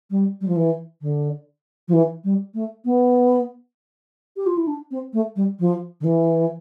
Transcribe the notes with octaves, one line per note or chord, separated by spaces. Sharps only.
G3
G3
F3
E3
D3
F3
E3
G3
A3
B3
G4
F4
E4
D4
C4
A3
G3
F3
D3
E3